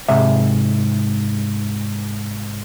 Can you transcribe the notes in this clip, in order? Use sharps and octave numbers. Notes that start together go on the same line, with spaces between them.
G#2 C3 E5